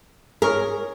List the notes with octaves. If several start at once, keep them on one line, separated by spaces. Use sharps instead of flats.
G#4 A#4 C#5